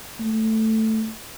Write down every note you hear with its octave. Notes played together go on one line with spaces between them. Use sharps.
A3